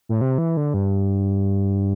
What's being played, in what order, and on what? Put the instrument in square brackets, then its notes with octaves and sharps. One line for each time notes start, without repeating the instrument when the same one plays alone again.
[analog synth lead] A2
C3
E3
D3
G2